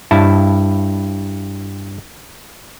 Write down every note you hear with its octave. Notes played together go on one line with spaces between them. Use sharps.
G2 E4 A5